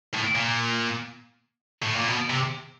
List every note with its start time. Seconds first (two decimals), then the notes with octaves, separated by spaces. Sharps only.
0.14 A2
0.35 A#2
1.83 A2
1.96 A#2
2.08 B2
2.30 C3